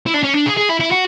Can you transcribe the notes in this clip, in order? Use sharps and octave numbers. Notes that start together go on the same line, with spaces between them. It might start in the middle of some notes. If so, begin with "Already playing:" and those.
E4
D4
C#4
D4
G#4
G#4
E4
E4
F#4